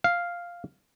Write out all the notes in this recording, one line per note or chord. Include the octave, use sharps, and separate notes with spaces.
F5